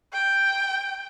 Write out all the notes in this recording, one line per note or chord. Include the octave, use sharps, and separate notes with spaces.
G5